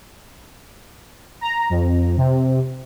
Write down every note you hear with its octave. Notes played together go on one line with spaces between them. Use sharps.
A#5
F2
C3